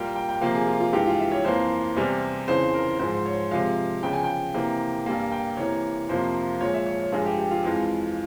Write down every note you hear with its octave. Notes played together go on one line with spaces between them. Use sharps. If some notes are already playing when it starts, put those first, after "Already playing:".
Already playing: A#2 G3 A#3 G5
G5
G5
C3 F3 A#3 F5
G#4
F4
F4
G2 E3 G#3 G4
F4
E5
C#5
F2 E3 A#3 C5
E2 C3 G3
F2 C#3 E3 C5
A#4
G#2 F3 G#3 C5
C#5
C3 F3 G#3 F5
E2 C#3 F3 G5
G#5
G5
C3 E3 A#3
G2 G3 A#3 G#5
G5
C3 E3 A#3 C#5
F2 C3 F3 A#3 C5
A#2 F3 G#3 C#5
E5
C#5
C#5
G2 F3 G#3 G#4
G4
G4
F4
F2 E3 G#3